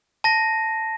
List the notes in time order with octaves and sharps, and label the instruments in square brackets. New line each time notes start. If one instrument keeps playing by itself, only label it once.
[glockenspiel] A5 A#6